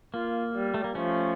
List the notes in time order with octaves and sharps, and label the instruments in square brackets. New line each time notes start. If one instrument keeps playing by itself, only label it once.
[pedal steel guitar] A#3 [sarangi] F4
[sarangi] G3
[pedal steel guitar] A3
A#3
[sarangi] F3 [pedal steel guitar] A3 C#4